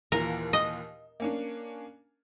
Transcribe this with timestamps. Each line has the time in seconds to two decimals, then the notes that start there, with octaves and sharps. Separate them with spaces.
0.12 D#2 A#2 E3 A#4
0.53 D#5
1.20 A#3 C#4 D4